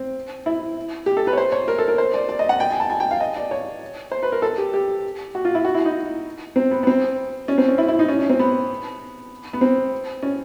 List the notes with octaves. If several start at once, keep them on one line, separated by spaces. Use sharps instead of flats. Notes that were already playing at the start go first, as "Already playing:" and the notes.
Already playing: C4
E4
G4
A4
B4
C#5
C5
C#5
A#4
A4
A#4
C5
D5
D5
D#5
F#5
G5
G#5
A5
G#5
G5
F5
D#5
D5
C#5
C5
B4
A#4
A4
G4
G4
F#4
F4
E4
F#4
E4
D#4
C4
B3
B3
C4
C#4
C4
C#4
E4
E4
D#4
C#4
C#4
C4
B3
B3
C4
C#4